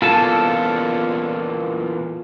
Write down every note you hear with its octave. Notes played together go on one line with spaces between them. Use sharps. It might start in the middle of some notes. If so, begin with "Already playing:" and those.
E2 A#2 F4 A4 A5